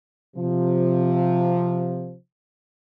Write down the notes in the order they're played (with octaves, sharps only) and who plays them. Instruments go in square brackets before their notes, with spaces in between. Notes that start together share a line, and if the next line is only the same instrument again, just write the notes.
[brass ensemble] C3 F3